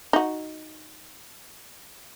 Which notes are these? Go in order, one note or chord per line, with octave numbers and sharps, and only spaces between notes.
D#4 F#4